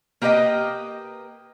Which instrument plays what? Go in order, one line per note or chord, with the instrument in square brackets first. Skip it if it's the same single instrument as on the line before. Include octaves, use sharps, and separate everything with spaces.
[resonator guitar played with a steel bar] A#3 G4 B4 D5 D#5 G5